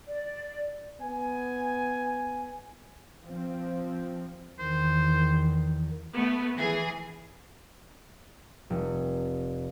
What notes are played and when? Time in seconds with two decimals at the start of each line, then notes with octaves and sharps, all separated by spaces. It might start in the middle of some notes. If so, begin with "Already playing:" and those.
0.07 D5
1.01 B3 G#5
3.23 F3 C4
4.59 E2 D#3 C5
6.15 A3 B3
6.56 E3 G#4
8.70 F1